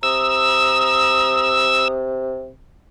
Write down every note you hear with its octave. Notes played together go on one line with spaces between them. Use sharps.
C3 A#5 D#6 E6